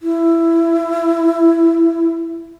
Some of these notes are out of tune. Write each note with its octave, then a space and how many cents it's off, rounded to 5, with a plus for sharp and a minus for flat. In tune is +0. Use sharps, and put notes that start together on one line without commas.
E4 +15